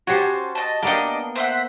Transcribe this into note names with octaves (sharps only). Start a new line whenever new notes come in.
C#4 F#4 G4 C5 A5
D#5 A5
A#3 B3 D4 D#5 G5
C5 E5 F#5